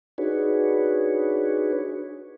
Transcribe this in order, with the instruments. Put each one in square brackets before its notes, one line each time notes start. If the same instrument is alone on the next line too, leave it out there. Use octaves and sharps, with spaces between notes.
[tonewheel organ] D4 D#4 F#4 G#4 B4 C#5